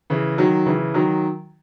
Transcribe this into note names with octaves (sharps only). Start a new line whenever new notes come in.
C#3 E3
D#3 F#3
C#3 E3
D#3 F#3